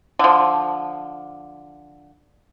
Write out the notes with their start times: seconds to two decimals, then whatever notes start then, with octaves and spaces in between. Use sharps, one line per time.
0.19 D3 F3